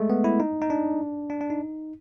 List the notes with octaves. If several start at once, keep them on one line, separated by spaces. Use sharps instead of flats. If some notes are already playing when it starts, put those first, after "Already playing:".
Already playing: G#3 A3
B3
E4
D#4
D#4
D4
D4
D4
D#4